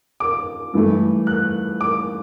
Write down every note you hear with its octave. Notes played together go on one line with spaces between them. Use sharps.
D6
G2 E3 A3
F#6
D6